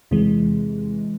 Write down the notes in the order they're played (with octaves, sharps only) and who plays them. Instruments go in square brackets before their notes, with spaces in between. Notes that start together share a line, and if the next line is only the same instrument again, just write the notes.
[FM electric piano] E2 C3 E3 G#3